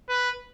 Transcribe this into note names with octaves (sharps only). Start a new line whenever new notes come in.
B4